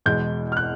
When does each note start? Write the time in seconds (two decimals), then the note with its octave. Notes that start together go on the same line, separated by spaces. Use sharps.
0.06 E2 B2 G#3 G6
0.52 F6
0.57 F#6